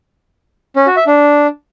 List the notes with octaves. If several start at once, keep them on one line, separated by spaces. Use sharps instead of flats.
C#4
F#4
E5
D4